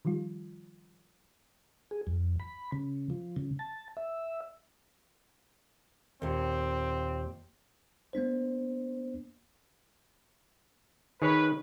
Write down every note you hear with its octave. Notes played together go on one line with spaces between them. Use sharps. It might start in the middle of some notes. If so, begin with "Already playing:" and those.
D#3 F3 G3 F4
G#4
F2
B5
C#3
F3
C#3
A5
E5
D#2 A#2 C4
A#3 B3 D4 C5
D#3 G#4 B4 C#5